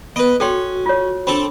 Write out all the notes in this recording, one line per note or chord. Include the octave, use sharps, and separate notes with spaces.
B3 B4 D#5
C#4 F#4 A4 G5 C6
F4 C#5
C4 D4 A4 B5